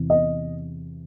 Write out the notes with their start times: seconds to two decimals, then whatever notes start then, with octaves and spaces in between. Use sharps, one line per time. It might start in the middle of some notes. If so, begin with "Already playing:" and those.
Already playing: E2 C3 E3
0.10 D#5